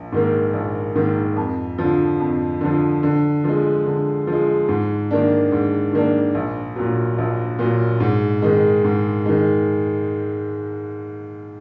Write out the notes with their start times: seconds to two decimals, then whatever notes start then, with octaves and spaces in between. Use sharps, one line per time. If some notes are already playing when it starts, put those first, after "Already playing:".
Already playing: A#1
0.12 G#2 D#3 A#3
0.53 A#1
0.95 G#2 D#3 A#3
1.36 F2
1.78 D3 F3
2.20 F2
2.61 D3 F3
3.03 D3
3.44 F3 G#3
3.86 D3
4.27 F3 G#3
4.68 G#2
5.11 D#3 A#3 D4
5.52 G#2
5.93 D#3 A#3 D4
6.35 A#1
6.76 A#2 F#3
7.18 A#1
7.59 A#2 F#3
8.00 G#2
8.42 D#3 G#3
8.84 G#2
9.26 D#3 G#3